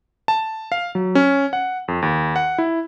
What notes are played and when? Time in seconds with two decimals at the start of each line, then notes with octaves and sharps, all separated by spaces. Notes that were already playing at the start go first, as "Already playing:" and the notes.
0.28 A5
0.72 F5
0.95 F#3
1.15 C#4
1.53 F#5
1.88 F2
2.02 D#2
2.36 F#5
2.58 E4